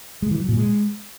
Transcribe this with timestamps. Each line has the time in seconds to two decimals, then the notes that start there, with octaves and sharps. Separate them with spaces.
0.22 G#3
0.31 E3
0.40 F#3
0.49 A#2
0.57 G#3